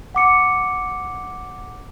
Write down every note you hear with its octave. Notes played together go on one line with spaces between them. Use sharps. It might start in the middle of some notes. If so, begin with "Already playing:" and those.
F#5 D6 C#7